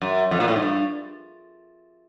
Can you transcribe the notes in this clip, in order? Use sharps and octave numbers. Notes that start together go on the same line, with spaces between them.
F#2
F2
A#2
A2
G#2
G2